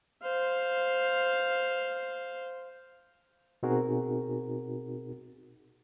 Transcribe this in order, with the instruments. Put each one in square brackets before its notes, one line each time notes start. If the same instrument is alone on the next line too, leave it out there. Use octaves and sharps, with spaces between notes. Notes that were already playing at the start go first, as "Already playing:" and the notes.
[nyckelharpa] C5 F5
[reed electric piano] B2 C4 D#4 F#4 G#4 A#4